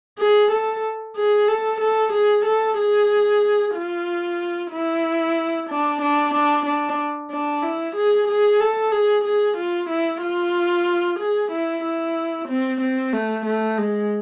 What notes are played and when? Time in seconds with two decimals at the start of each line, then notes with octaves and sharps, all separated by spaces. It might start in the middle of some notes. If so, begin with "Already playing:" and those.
0.19 G#4
0.51 A4
1.16 G#4
1.48 A4
1.81 A4
2.13 G#4
2.46 A4
2.78 G#4
3.75 F4
4.72 E4
5.69 D4
6.01 D4
6.34 D4
6.66 D4
7.31 D4
7.63 E4
7.96 G#4
8.28 G#4
8.60 A4
8.92 G#4
9.25 G#4
9.57 F4
9.90 E4
10.22 F4
11.19 G#4
11.52 E4
11.84 E4
12.48 C4
12.81 C4
13.13 A3
13.46 A3
13.78 G#3